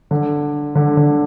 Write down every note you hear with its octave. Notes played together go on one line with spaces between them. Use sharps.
D3
D3
D3